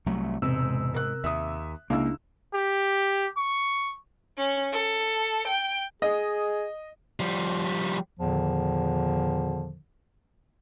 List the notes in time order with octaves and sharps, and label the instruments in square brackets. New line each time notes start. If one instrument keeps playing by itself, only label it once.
[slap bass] C2 F#3 A3
[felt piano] E1 [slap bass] G#2 [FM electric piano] C3 E6
[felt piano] A#4 F#6
[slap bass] D#2 [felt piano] E5 D#6
[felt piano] C#2 F5 E6 [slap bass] A#3 [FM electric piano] D4 E4
[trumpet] G4
C#6
[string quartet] C#4
A4
G5
[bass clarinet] G#4 [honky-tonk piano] D#5
[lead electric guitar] F3 G3
[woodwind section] E2 A#2 D3 D#3 F3